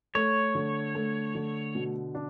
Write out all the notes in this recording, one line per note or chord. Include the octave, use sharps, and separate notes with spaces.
A3 C#5
D3
A3
D3
B2
D4